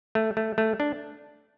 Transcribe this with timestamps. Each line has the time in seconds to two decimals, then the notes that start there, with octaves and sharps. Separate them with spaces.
0.15 A3
0.37 A3
0.58 A3
0.80 D4